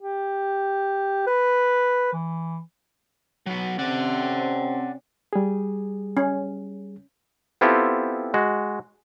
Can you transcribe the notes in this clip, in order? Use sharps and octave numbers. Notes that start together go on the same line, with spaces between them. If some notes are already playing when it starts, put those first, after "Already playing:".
G4
B4
E3
F#3 B3
C3 C4 C#4 D5 F#5
G3 G#4
C#4
B3 C4 E4 F4 G4 A4
G#3 F#4